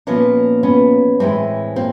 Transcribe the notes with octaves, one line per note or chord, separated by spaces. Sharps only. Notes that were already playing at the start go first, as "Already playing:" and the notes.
A#2 F3 A#3 B3 C#4
B3 C#4
A2 E3 G#3 A#3 C4
A#3 C4